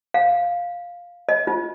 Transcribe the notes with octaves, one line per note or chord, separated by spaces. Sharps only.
F5
D#5
F4